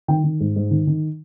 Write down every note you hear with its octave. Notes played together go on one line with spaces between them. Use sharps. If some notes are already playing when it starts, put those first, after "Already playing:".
D#3 G5
D#3
G#2
G#2
D#3
D#3